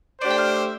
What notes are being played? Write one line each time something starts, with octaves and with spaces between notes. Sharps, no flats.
A3 D4 G4 C5 D5
G5
F5
E5